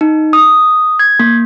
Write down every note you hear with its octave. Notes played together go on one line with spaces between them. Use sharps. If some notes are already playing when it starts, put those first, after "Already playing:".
D#4
D#6
G#6
A#3